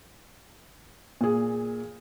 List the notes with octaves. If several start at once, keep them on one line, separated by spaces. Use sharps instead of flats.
A#2 G#4